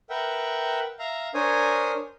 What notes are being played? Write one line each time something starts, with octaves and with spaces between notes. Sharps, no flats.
A#4 B4 E5 F#5 G5
E5 F5 A#5
D4 A#4 C5 C#5 G#5 D#6